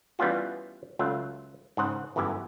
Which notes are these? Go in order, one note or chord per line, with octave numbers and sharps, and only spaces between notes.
E3 G3 B3 C#4 F4 F#4
C#2 F#3 A3 F4
G#2 C#3 C5 F#5
G1 F#2 E3 B3 G4 G#5